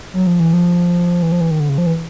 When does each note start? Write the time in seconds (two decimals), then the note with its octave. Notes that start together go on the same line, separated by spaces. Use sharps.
0.13 F#3
0.27 F3
0.40 E3
0.53 F3
1.22 E3
1.32 F3
1.41 E3
1.51 D#3
1.60 D3
1.69 C#3
1.78 F3
1.86 E3